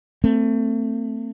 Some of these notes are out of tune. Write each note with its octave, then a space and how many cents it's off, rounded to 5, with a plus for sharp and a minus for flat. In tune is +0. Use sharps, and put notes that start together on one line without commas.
A3 +25 C4 -20